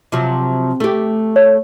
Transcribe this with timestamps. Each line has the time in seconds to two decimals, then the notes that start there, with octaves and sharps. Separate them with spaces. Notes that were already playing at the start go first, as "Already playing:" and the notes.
0.12 C3 F3 F#3
0.80 A3 G4
1.36 C#5